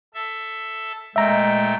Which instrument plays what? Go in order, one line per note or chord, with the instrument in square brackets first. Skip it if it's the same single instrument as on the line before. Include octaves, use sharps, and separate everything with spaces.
[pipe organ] A4 E5
[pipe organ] A#2 A3 G5 [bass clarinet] G#3 [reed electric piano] E5 A#5